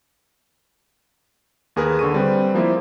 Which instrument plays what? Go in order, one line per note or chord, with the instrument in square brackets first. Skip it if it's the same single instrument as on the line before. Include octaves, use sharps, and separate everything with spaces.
[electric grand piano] D#2 G#4 A#4 B4
D3 C#6 D#7
G3 C4 B4
F3 A#3 C4 E4